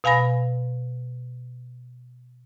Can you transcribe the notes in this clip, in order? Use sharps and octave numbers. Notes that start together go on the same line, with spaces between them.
B2 F5 G#5 B5 A#6